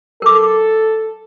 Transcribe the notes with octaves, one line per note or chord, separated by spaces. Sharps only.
A4 A#4 D6